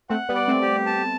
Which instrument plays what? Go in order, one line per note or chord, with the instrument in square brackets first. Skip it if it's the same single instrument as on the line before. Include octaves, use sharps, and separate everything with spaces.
[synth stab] A3 C4 [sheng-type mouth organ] F#5
[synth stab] G3 B3
[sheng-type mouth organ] D5
[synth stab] A3 C4
[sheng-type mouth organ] G4
A5